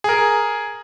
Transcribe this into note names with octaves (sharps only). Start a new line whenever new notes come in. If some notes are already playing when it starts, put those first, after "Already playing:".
G#4 A#4